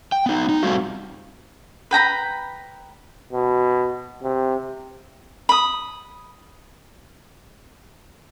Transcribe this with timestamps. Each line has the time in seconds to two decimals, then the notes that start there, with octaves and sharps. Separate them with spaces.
0.12 G5
0.26 B3 D#4
0.49 D#4
0.63 G3 A3 C4 F4 F#4
1.91 B4 G5 A#5 B5
3.33 B2
4.22 C3
5.49 B5 D#6